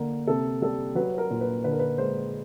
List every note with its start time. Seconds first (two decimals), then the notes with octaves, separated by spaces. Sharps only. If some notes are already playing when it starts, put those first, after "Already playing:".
Already playing: D3 A#3
0.27 C3 A4
0.62 G3 A4
0.95 F#3 B4
1.14 B4
1.18 A#4
1.30 A#2
1.41 B4
1.64 D3 B4
1.72 A#4
1.79 B4
1.98 G#3 C5